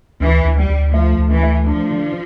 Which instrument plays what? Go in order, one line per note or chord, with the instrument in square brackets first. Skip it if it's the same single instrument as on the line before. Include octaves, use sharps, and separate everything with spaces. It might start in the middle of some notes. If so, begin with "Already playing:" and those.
[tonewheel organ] D2 [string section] E3
[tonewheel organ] D2
[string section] G3
[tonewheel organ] D2
[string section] F3 [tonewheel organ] A3
[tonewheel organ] D2
[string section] E3
[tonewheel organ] A3
[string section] F3 [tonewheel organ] D4
[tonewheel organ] D3